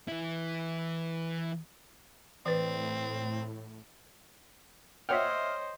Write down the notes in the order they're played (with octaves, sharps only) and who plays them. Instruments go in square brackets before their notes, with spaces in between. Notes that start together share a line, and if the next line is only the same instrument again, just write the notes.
[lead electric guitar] E3 E4
[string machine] A2 [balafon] E3 B4 D5 [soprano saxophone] C4
[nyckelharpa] C5 D#5 [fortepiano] C#5 F#5 G5 [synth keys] E5 F6